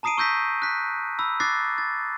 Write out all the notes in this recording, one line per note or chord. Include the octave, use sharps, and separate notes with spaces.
A5 A#5 D#6 C7 D7 D#7
C#6 E6 G6 A#6 B6
F#6 B6
B5 E6
D6 F#6 A6 A#6 C7
A6